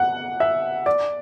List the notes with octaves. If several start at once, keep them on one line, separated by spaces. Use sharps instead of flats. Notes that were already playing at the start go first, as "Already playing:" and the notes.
Already playing: F#5
E5
D5